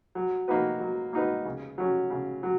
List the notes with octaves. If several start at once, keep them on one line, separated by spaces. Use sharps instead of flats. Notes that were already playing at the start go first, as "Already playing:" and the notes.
F#3
A#3 D#4 F#4 B4
F#3
A#3 D#4 F#4 B4
C#3
F#3 C#4
C#3
F#3